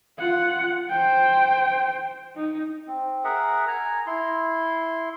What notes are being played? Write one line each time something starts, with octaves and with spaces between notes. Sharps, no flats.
F4 F#5
C5 G5
D#4
C4
G#4 A#4 E5 F#5
G#5 A#5
E4 C6